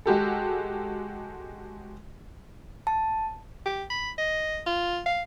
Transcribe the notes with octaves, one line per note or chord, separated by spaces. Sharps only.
G#3 F#4 G4 A4
A5
G4
B5
D#5
F4
F5